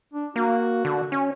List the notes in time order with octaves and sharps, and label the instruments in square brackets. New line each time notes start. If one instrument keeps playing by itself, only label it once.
[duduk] D4
[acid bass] A#3 [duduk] F#4
[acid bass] D3
C#4